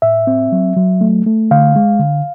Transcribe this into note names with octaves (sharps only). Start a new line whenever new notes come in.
A2 E5
C4
F#3
F#3
A3
A3
D3 F5
G#3
D3